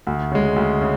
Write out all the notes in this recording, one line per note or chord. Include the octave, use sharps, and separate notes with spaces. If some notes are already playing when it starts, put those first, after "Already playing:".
D2
C#3 G#3
D2
C#3